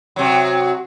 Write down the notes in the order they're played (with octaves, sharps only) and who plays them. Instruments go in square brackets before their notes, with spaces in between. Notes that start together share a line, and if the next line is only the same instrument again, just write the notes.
[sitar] C3 F#3